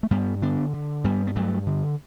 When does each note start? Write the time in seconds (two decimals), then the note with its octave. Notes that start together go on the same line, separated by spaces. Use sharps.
0.03 A3
0.11 G2 G3 B3
0.42 D3 B3 D4
0.73 D3
1.04 G2 G3 B3
1.27 B3
1.36 G2 F#3 A3
1.67 D3